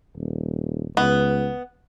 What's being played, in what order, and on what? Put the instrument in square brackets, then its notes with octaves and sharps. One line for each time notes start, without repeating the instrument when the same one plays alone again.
[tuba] D#1
[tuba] C#2 [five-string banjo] B3